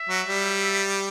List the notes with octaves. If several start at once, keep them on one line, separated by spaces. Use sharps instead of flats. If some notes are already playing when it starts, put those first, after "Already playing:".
Already playing: E5
F#3
G3